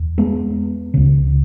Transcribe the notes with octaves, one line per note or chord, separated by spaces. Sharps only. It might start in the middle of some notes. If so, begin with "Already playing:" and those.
Already playing: E2
G#3 B3
C#2 C#3